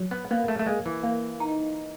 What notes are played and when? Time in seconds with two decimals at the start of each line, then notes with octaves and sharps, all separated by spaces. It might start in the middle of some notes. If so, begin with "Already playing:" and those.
Already playing: F#3
0.11 B3
0.31 A#3 B3
0.48 A3
0.59 A3
0.66 G#3 A#3
0.86 E3
1.03 A#3
1.40 D#4